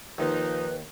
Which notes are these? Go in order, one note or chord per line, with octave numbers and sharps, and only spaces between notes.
D#2 F3 D#4 B4